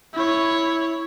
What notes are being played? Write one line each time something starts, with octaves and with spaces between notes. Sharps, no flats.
E4 C#5